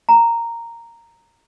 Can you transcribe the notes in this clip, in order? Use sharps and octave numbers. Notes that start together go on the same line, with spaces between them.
A#5